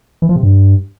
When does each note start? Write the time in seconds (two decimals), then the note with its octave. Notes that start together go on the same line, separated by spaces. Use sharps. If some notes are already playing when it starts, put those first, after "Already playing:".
0.22 E3
0.29 F3
0.36 C3
0.43 G2